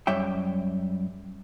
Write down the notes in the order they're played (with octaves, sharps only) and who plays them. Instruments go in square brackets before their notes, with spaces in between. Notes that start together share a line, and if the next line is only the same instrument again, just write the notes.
[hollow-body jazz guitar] F#2 G3 C#5 E5 G5